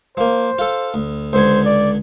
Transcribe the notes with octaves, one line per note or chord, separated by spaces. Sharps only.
F3 A#3 C5
F4 A4
D2
C#2 D3 C5 G#5
D5